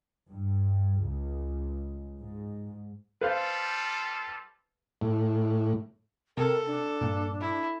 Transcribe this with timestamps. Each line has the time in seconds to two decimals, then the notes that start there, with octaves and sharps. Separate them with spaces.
0.30 G2
1.04 C#2
2.20 G#2
3.21 G3 F4 A4 B4 C5 F5
5.01 A2
6.37 C3 A4 A#4
6.67 D4
7.01 G2 A#2
7.40 E4